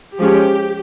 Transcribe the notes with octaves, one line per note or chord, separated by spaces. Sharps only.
F3 G#3 C#4 G4